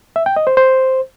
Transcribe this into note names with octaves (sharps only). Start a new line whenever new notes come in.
E5
G5
D#5
C5
C5